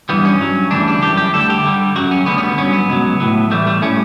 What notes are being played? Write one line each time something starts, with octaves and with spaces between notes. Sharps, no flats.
G2 E3 G3 B3
C#4
G2 F#3
D2 C#3 E3 G3 D4
D4
F#2 E3 G3 G4
G4
D2 D3 G3 A4
G4
G2 D3 G3
F#2 C#3 F#3 F#4
C#4
D2 D3 G3 B3
C#4
B3
G2 F#3 C#4
B3
C#2 B2 F#3
A2 F#3
A2 E3 G3 A3
A3
A2 G3 C#4